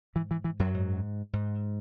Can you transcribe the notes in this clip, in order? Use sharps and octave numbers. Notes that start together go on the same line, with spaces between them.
G#2 E3
E3
E3
F#2 F#3
G#2
G#2